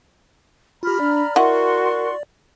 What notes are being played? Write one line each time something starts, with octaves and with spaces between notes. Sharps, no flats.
F4 G4 A#5 B5 F6
D4 D5
E4 F#4 A#4 D#5 F#5 C6 C#6